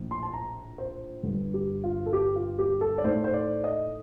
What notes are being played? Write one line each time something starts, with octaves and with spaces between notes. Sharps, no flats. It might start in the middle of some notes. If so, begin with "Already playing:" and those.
Already playing: A#1 A2 F3
C6
A5
A#5
C5
G1 G2 D3
G4
F4
A4
G4
F4
G4
A4
D5
A2 A3 D#4 C5
C5
D5
D#5